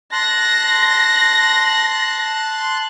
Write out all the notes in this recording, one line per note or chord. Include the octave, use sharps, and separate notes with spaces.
A5 C6 F#6 A#6